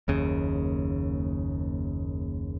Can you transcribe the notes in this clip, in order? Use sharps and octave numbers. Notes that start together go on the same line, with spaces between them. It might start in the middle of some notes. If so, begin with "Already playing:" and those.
F#1 D#2 C#3